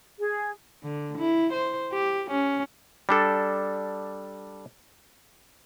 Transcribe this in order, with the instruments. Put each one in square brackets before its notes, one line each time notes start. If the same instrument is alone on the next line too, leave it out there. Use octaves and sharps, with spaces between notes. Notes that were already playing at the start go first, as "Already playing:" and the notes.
[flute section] G#4
[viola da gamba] D3
E4
C5
G4
C#4
[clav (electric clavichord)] G3 D4 A4